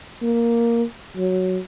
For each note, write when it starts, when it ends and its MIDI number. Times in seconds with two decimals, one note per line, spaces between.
0.22 0.83 58
1.16 1.59 54